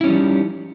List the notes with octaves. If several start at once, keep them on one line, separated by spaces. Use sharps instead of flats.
F3 G3 C#4 D#4 E4